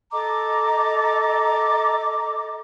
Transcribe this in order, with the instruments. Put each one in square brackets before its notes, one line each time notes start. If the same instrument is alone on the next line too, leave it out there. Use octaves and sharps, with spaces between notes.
[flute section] A4 D#5 A#5 D6